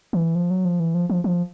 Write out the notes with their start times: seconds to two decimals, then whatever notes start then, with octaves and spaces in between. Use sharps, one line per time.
0.13 E3
0.35 F3
0.50 F#3
0.65 F3
0.80 E3
0.95 F3
1.10 F3
1.24 F3